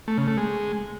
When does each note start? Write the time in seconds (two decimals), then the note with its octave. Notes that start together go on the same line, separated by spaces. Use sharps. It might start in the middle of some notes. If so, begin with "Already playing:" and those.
0.08 A3
0.18 C#3
0.28 A3
0.37 G#3